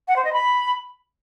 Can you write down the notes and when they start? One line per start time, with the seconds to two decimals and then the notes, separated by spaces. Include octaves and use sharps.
0.08 F#5
0.16 C5
0.25 D#5
0.33 B5